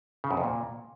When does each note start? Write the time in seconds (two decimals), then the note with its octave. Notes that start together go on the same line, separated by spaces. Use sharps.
0.24 C#3
0.31 F#2
0.37 F2
0.44 A#2